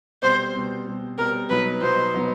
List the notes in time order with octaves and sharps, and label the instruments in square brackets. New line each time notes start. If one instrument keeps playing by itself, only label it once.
[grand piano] B2 G3 C4 [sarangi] C5
[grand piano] B2 G3 C4
B2 G3 C4
[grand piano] B2 G3 C4 [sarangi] A#4
[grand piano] B2 F#3 B3 D#4 [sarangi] B4
[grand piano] B2 F#3 B3 D#4 [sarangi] C5
[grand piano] B2 F#3 B3 D#4